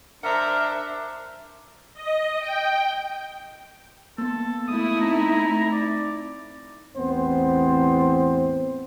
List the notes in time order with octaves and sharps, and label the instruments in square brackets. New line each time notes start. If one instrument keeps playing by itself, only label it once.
[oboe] D4 [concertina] A#4 [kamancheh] C5 E5 [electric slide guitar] F#5 A#5
[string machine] D#5
G5
[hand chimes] A#3 B3 [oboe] A4
[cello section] A3 E4 [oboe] D#6
[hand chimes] C4 D#4 [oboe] A#5
[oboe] D5
[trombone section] A1 E2 B3 C4 C5